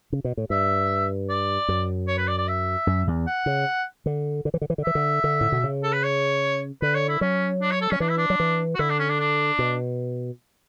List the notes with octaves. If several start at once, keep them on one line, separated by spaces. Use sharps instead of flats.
C#3
B2
A2
G2 E5
D5
F#2
C#5
B4
D5
D5
E5
F#2
E2
F#5
C#3
D3
D3
E3
D3
E3
D3
E3 E5
D3
D3
A2
B2
C#3
A4
B4
C#5
D3 B4
C#5
E4
F#3 C#4
D4
C#5
A4
F#3 C#4
E3 D4
E4
D4
F#3
E3
F#4
D3 E4
D4
C#4
D4
D4
B2